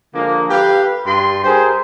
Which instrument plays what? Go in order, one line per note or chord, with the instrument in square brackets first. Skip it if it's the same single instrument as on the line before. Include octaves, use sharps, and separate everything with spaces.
[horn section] D3 F3 G#3 A#3
G4 A4 B4 F5
G2 C6
G4 G#4 A#4 C5